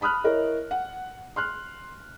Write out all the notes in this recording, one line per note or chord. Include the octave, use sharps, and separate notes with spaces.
A5 B5 D#6 F6 F#6
E4 A#4 C#5 D#5
F#5
C6 F6 F#6